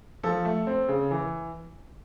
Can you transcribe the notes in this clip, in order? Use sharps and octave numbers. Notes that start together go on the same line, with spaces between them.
F3 A4
A3
C4
C#3
E3